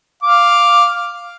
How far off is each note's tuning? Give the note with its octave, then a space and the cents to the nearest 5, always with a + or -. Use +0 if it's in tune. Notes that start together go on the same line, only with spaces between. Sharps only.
F5 +0 D6 +0